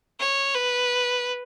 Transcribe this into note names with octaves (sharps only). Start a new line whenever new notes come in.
C#5
B4